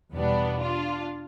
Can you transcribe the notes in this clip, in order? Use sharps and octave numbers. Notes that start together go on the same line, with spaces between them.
E2 B2 G3 B3 D4
D4 F4